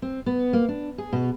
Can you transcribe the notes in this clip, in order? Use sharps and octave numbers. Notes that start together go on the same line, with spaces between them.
C4
B3
A#3
D4
G#4
B2